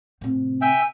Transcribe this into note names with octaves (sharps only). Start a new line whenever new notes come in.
A2 C3
E5 G5 G#5